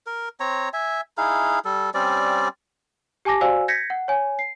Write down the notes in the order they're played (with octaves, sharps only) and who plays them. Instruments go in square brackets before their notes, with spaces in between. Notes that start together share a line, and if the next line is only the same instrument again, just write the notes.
[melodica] A#4
C4 C#5 A#5
E5 G#5
D#4 E4 G#4 F5
G3 A4
G3 C4 C#4 D5
[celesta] G4 G#5 A5 D6 A#6
F#4 C5 D5 F5 G#5 E6
G6 G#6 A#6 B6 C#7
F#5
C#5 G#5
C7